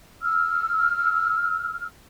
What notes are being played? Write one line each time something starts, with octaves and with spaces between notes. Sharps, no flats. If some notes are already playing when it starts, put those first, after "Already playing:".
E6 F6